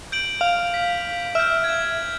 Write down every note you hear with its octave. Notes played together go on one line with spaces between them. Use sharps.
G6 D7 F#7
F5
B6
E5 F6 G6
G#6